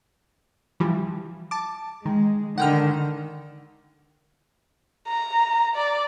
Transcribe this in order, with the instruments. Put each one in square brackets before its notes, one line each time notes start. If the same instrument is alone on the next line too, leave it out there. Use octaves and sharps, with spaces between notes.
[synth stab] E3 F3 G3
A5 D6
[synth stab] D#3 [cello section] G#3
[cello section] D3 D#3 [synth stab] F#5 G5 F6
[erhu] A#5
D5